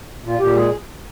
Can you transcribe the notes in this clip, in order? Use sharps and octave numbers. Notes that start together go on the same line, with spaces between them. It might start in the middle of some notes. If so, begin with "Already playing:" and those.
A#2
F4
A#2 G4
G#3 G#4